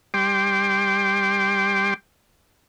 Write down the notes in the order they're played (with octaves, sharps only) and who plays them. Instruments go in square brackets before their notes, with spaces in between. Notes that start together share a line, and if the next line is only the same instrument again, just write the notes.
[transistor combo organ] G3 G5 C6 D6